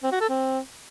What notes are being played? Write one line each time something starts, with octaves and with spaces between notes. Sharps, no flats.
C4
F#4
A4
C4